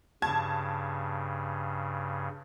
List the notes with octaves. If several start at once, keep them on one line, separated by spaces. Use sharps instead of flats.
G2 C#3 A5 G#6